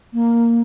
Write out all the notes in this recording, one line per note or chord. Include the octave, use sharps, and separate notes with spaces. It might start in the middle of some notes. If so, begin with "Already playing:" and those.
A#3